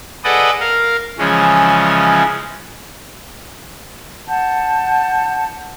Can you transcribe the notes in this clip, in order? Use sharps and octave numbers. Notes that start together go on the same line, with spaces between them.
G#4 A4 B4 D5 D#5 F#5
A#4 F5
C#3 E3 F3 G#3 C#4
F#5 A5 G6